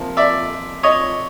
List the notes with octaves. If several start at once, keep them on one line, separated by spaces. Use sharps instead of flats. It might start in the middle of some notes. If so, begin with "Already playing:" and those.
Already playing: C3 F3 A#3
D5 E5
C#5 D#5